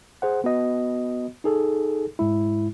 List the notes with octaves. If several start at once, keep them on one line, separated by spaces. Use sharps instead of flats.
G#4 C5 F#5
B3 F#4 D#5
D#4 G#4 A4
G#2 G#3 E4